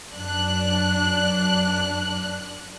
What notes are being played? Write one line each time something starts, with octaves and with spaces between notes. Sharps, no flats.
F#2 D4 F#6